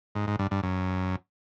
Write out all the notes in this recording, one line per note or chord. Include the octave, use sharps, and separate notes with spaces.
G#2
G#2
G2
G2
F#2